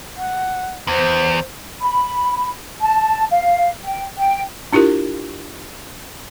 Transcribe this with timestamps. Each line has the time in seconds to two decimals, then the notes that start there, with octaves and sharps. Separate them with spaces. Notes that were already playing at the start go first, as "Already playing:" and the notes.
0.17 F#5
0.87 E2 C5
1.80 B5
2.80 A5
3.31 F5
3.84 G5
4.16 G5
4.73 D4 E4 F4 G4 A#4